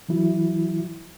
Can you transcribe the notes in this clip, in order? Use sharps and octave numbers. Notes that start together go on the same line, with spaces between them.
E3 F#3 E4 F#4